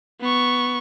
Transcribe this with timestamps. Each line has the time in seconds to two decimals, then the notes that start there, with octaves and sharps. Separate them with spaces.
0.21 B3 C#6